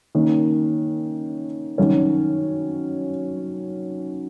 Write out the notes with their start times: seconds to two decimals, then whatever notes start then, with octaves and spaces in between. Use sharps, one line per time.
0.15 D#3 A#3 C#4
1.78 D#3 F#3 C#4